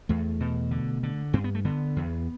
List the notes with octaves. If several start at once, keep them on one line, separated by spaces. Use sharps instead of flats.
E2 A3
B2
D3
D3
G2 C4
B3
A3
D3 B3
E2